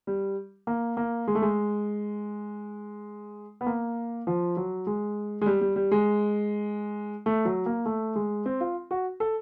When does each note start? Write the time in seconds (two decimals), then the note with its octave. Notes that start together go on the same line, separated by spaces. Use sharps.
0.07 G3
0.67 A#3
0.97 A#3
1.28 G#3
1.35 A3
1.42 G#3
3.61 B3
3.66 A#3
4.27 F3
4.57 F#3
4.87 G#3
5.41 G#3
5.46 G3
5.61 G3
5.76 G3
5.92 G#3
7.26 A3
7.45 F#3
7.66 A#3
7.86 A3
8.16 G#3
8.46 C4
8.61 F4
8.91 F#4
9.20 A4